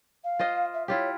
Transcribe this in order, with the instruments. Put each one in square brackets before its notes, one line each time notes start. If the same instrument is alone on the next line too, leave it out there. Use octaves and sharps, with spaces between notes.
[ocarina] F5
[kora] F4 C5 D#5
[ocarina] E5
[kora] E4 F4 G4 [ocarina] C#5